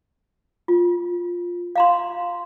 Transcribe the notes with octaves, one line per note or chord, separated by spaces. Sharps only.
F4
F5 A#5 C6